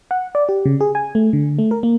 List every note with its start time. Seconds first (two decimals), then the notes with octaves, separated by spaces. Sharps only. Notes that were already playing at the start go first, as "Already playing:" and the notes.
0.11 F#5
0.35 D5
0.49 G4
0.65 C#3
0.81 G#4
0.95 G#5
1.15 A3
1.33 D3
1.59 A3
1.71 A#4
1.83 A#3